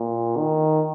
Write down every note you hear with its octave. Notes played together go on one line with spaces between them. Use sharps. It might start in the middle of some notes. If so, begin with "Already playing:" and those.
Already playing: A#2
D#3